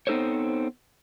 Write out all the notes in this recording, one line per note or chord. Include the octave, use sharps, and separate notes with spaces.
B3 C4 D#4 A4 C5 C#5